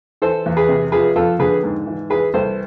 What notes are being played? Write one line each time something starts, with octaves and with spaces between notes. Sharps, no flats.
E3 A4 C5
E2
G#4 B4
C3
F3 G#4 B4
F2 F4 A4
D3 G#4 B4
G#2
E3
E3 G#4 B4
C2 A4 C5